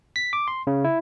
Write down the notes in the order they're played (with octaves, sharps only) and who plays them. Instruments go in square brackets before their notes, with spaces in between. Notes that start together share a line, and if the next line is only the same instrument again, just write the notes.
[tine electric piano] B6
D6
C6
C#3
E4